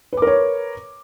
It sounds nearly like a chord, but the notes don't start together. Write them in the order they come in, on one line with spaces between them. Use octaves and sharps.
B4 D6 A#4 C#5